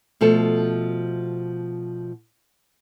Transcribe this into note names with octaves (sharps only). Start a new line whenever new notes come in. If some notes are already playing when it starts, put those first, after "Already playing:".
B2 F3 A3 A4